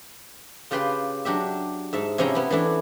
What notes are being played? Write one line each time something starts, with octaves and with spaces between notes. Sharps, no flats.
C#3 F4 G4 B4 G5 C6
F#3 D4 G4 E5
G#2 E5 A5
C3 F3 C#4 E4 G5 A#5
B3 C#4 E4
E3 A3 D4 E4